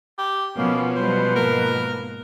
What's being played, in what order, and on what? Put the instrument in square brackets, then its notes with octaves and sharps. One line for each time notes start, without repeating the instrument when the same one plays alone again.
[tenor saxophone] G4
[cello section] B2 F3 [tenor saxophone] A#3 [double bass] B3 [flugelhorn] C#4
[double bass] F#3 G3 [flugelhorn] B4 [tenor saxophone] C5
[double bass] G#2 A#3 [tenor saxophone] A#4